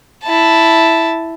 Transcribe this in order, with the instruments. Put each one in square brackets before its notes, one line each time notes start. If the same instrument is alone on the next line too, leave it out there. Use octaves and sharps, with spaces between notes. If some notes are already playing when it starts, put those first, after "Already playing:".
[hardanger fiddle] E4 A5